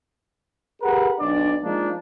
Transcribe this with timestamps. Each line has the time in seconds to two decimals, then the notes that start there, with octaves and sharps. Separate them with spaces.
0.82 G4 G#4 A#4 B4 F#5
1.20 B1 D4 D5
1.64 F3 G#3 A#3 D4 D#4